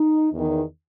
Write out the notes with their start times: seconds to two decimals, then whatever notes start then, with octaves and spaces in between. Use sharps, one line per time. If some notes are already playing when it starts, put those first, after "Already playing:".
Already playing: D#4
0.33 E2 D#3